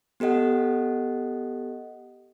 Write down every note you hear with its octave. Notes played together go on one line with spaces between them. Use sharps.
B3 G4 A4 D#5 F#5